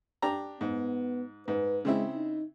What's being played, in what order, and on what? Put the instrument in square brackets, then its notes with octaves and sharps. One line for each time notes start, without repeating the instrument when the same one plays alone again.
[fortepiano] D4 G4 A#5
[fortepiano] G#2 [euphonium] B3
[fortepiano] G#2 [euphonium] B4
[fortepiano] C#3 C4 E4 [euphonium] G#3
[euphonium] D#4